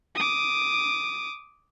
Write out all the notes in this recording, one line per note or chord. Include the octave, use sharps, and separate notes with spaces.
D6 D#6